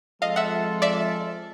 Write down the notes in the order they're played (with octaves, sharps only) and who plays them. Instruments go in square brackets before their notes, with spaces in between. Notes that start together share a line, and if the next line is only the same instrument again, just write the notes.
[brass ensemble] F3 G#3 C4 F4 A4 [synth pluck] D#5 F5
[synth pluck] E5 F#5
D5 E5